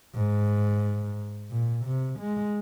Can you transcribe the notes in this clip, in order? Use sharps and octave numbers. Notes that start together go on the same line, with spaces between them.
G#2
A#2
C3
G#3